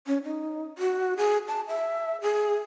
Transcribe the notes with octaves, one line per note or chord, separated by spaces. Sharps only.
C#4
D#4
F#4
G#4
A5
E5
G#4